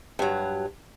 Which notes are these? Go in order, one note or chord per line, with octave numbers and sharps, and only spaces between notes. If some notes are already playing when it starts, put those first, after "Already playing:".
G2 F#3